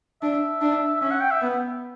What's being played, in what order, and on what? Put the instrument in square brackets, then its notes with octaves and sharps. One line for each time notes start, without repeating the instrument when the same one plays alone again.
[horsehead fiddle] D4 [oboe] E5
[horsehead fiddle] D4
[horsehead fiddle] C#4 [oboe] E5
[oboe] F#5
G5
E5
[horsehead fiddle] B3